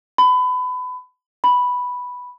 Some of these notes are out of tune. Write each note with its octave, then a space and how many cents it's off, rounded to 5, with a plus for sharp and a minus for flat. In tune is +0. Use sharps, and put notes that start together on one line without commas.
B5 +25
B5 +0